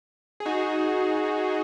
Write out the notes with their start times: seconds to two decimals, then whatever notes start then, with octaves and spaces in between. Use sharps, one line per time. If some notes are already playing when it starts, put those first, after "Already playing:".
0.40 G#4
0.46 D#4 F#4